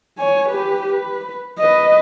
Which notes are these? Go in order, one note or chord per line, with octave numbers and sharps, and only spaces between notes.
C#5 G#5
G4 B4
B4
B4 D#5